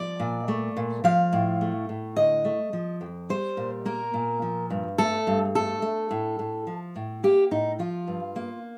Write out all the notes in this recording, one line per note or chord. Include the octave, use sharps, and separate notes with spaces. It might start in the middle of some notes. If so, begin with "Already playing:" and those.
Already playing: F3 D5
A#2
A3
A#2
F3 F5
A2
A3
A2
D3 D#5
A3
F3
F2
G3 C5
A#2
A#3 A#4
A#2
F3
G2
A3 A4
G2
A3 A4
A3
A2
A2
F3
A2
A#3 G4
A2 D#4
F3 F4
G2
A#3